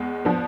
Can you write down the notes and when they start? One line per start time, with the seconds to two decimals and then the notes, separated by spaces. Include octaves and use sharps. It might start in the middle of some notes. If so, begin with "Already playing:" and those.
Already playing: E2 G#3
0.25 F3 B3 D4